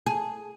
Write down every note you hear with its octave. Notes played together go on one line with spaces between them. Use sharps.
G#4